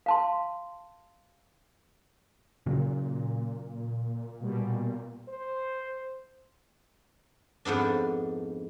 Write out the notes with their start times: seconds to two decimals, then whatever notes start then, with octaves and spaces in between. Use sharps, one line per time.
0.06 F5 A5 C6
2.66 A#2 C#3 F#3
4.40 B2 G3
5.29 C5
7.65 F2 G#2 B3 D4